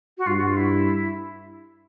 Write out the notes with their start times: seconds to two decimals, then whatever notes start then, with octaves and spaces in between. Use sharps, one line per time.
0.18 F#4
0.27 G2 F4
0.37 F#4
0.47 F4
0.57 E4